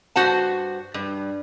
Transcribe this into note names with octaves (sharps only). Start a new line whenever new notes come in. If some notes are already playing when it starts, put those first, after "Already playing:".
G2 F#4 C5 F#5 A5
G2